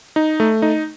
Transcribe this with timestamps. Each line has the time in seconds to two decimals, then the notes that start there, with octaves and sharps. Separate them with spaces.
0.16 D#4
0.40 A3
0.62 D#4